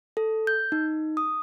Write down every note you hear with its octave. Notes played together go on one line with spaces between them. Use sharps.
A4
G6
D#4
D#6